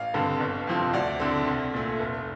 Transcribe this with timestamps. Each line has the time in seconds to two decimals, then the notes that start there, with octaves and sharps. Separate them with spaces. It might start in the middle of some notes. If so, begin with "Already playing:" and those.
Already playing: A1 F5
0.14 G2 D3 G3 C4
0.40 G1
0.67 F2 C3 F3 C4
0.93 D2 D5
1.20 D3 A3 C4
1.47 C2
1.74 A#2 A3
1.99 F1